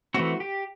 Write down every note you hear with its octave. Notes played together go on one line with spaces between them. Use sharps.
E3 A3 C4 F#4
G4